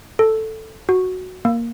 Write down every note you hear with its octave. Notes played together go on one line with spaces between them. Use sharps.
A4
F#4
A#3